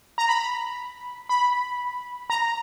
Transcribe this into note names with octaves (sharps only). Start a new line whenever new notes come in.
A#5
B5
B5
A#5